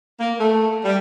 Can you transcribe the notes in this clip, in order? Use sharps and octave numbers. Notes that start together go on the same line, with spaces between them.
A#3
A3
G3